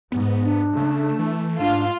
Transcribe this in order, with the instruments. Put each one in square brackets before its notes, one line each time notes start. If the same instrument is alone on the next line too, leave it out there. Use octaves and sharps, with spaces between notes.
[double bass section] G#2 [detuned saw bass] B3
[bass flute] D4
[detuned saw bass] C#3 [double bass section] A3
[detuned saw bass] E3
[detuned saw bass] G#2 [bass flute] D4 [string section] F4